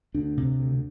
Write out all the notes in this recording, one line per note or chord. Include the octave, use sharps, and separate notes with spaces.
D2 D4
C3
D2